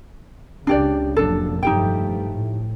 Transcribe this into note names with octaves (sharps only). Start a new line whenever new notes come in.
C#2 C#3 D4 G4 D5
F1 A#2 F#3 D4 A4
G2 F3 A3 D#4 G4 G5
A2